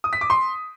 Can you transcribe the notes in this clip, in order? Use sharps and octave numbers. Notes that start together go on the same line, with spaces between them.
D#6
B6
D6
C6